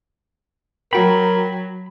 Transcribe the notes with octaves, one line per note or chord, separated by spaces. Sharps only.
F#3 F#4 A#4 G5 B5